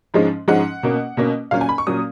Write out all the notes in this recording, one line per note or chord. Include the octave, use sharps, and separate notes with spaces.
G#2 F3 G#3 C#4
G#2 F3 G#3 C#4 F#5
B2 A#3 C#4
B2 A#3 C#4
A#2 F#3 C#4 F5
G#5
B5
C#6
A#2 F#3 C#4 D#6